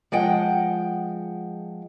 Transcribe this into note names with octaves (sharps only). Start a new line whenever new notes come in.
F3 G#3 F#5 G5